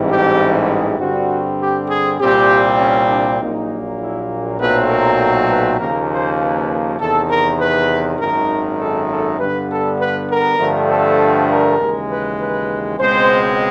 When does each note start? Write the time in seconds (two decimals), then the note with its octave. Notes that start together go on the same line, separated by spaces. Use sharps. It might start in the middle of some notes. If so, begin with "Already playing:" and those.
Already playing: A1 G#2 E3 G3 C4
0.09 G4
0.70 G#4
0.99 G2 D3 G3 C4 F#4
1.59 G4
1.89 G#4
2.20 C2 A#2 G3 C4 G4
2.79 C#4
3.09 D4
3.39 A#1 A#2 F#3 A#3 D#4
4.00 E4
4.60 B1 A#2 F#3 A3 C4 B4
4.90 A#4
5.50 B4
5.79 D#2 C#3 F3 A#3 A#4
6.10 C5
6.40 B4
7.00 E2 C3 D#3 A4
7.30 A#4
7.59 B4
8.19 G#1 F#2 D#3 A#4
8.80 A4
9.09 A4
9.39 G2 D3 G3 B3 B4
9.70 A4
9.99 B4
10.30 A#4
10.59 G2 D3 F3 A3 C4
10.89 A4
11.50 A#4
11.79 D#2 C#3 E3 G#3
12.09 B4
12.40 B4
12.99 C#2 B2 G#3 C4 C5